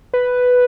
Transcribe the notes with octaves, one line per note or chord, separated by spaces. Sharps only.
B4